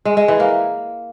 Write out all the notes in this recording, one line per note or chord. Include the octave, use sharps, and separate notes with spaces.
G#3
G#3
E3
A#3